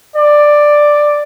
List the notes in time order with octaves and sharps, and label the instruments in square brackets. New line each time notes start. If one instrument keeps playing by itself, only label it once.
[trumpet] D5